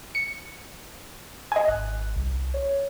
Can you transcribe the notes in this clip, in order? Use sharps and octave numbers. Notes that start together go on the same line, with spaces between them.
C#7
D#5 G#5
G#1 F#6
C2
C#5